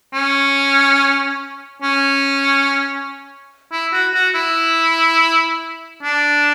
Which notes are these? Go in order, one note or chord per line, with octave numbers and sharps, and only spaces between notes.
C#4
C#4
E4
F#4
F#4
E4
D4